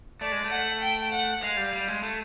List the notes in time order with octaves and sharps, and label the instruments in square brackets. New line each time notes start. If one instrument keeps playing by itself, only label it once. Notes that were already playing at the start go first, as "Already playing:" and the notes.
[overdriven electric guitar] A3 [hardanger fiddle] D5
[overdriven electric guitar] G#3
A3
[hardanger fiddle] F#5
G5
F#5
[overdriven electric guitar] G#3 [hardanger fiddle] F5
[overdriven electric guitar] G3
G3
G#3
A3